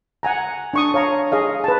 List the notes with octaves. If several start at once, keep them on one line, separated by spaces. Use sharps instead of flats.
F#5 G#5 A#5
D4 C#6 D#6
C#5 F5 A#5 C#6
G#4 D#5 F5
B4 A5